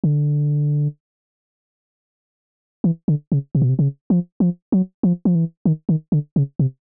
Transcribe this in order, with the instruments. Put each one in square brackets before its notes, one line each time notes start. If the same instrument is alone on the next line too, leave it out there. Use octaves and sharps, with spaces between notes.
[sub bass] D3
E3
D3
C#3
C3
B2
C3
C#3
F3
F3
F#3
F3
F3
E3
D#3
D#3
D3
C#3
C3